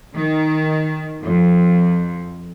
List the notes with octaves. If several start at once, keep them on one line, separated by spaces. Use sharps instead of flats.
D#3
F2